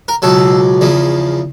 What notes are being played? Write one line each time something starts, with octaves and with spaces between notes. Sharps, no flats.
A#4
C#2 B2 F#3 A4
E2 C#3 F3